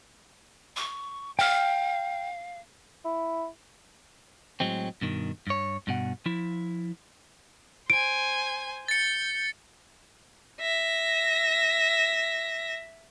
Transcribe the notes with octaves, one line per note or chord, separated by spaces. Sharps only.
C#6
F5 G5 F6
E4
A2 F#3 G#3 C4
G2 B2 D#3
G2 C#5
G2 B2 F#5
F3 E4
C5 G#5 D7
G6 A6 C#7
E5 A#6